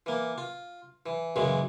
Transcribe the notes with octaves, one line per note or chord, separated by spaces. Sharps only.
E3 A#3
F4
E3
F#2 A#2 C#3 E3 G#3